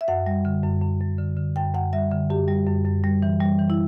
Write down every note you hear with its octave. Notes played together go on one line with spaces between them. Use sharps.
E5
F#2 F#5
G3
D3
F#2
F#2
F#2
D3
D3
F#2 G5
F#2 F#5
G3 E5
D3
F#2 G4
G3
F#2
F#2
G3
E3
G3
E3
E4